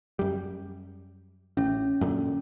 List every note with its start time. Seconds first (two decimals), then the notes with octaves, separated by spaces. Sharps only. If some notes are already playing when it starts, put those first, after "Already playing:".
0.19 F#2 G3
1.57 A1 C#4
2.01 F#2 A#2 D3